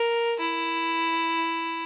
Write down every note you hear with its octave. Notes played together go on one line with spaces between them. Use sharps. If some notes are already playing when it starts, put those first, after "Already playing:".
Already playing: A#4
E4